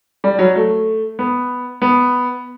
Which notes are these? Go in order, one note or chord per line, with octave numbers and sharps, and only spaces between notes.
G3
F#3
A3
B3
B3